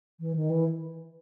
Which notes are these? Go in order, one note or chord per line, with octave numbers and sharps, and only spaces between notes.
E3
D#3
E3